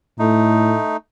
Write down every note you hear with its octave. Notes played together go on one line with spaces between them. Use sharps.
A2 A3 D#4